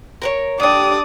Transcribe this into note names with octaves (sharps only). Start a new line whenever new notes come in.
A#4 B4 C#5
D3 D4 G4 D5 D#6